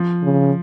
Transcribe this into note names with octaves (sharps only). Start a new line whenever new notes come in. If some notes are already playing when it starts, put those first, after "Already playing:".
Already playing: F3
C#3